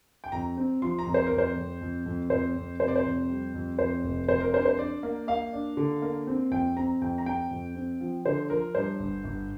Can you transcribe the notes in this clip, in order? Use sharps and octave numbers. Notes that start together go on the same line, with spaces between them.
G5
F2 A#5
C4
F3 C6
A#5
F2
C5
F2 A#4
C5
F2
F2
F2
F2 C5
F2
C3 C5
D5
C5
F2
G3
F2
F2 C5
F1
F2 C5
A#4
D4 C5
C5
D4 D5
A#3
A#3 F5
D4
D3
A#3
C4
F2 G5
C4 A#5
F2 G5
A#5
C4 G5
F2
C4
F3
D3 C5
F3 A#4
G2 C5
G1
G1